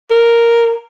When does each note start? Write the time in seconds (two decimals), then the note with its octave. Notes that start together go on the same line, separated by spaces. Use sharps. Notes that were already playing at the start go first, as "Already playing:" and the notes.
0.11 A#4